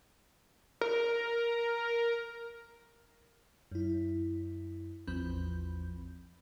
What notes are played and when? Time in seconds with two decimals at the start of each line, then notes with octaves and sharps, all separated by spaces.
0.81 A#4
3.72 F#2 E4
5.07 A1 E2 F3 C4 B5 G6